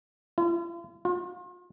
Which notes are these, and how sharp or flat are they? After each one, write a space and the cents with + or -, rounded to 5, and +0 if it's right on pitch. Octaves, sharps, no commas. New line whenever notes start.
F4 -45
F4 +35